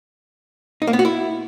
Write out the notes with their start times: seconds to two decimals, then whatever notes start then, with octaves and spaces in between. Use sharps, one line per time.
0.82 D#4
0.87 A#3
0.93 B3
0.99 F#4
1.05 E4